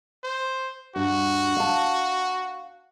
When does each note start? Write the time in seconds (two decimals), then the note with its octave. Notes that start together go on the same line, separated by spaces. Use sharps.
0.24 C5
0.96 G2 F#4
1.57 F5 A5